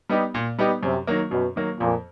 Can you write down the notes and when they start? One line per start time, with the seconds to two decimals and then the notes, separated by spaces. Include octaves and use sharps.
0.09 G3 B3 D#4 G4
0.34 A#2
0.58 G3 B3 D#4 G4
0.83 F#2 C3
1.07 D#3 F#3 A#3
1.31 F#2 B2
1.56 D#3 F#3 A#3
1.80 F2 A#2